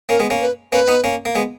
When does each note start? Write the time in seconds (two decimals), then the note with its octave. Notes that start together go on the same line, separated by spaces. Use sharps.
0.09 A#3 C#4 A#4
0.20 G#3 B3
0.30 A#3 C#4
0.41 B4
0.72 A#3 C#4 B4
0.88 B3 D#4
1.04 A#3 C#4
1.25 A#3
1.35 G#3 B3